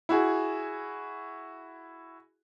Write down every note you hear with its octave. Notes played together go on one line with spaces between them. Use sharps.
E4 F#4 G#4